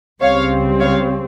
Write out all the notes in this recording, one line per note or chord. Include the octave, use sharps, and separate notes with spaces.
C#2 C#3 G3 C4 C#5 F5
C#5 F5